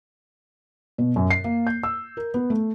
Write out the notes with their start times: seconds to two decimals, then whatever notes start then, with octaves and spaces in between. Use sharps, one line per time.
0.98 B2
1.16 F#2
1.30 C7
1.44 A#3
1.67 G6
1.83 E6
2.17 A#4
2.34 B3
2.50 A3